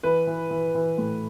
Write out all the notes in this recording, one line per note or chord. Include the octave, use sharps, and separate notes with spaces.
E3 B4
E3
E3
E3
A2